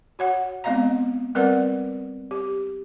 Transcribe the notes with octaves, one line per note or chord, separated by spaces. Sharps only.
F#4 C#5 F#5
G#3 B3 C4 D#5 F5 A#5
G3 C4 A#4 B4 D5 F#5
G4